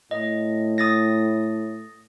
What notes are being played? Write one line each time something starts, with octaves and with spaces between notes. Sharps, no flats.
A2 D#5
D#6 A6 A#6